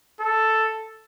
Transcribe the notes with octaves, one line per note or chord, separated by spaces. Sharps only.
A4